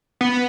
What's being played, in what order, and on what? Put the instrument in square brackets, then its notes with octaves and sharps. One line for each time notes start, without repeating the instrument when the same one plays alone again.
[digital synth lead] B3